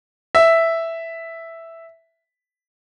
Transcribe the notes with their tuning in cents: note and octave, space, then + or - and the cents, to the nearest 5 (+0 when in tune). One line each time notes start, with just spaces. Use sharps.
E5 +0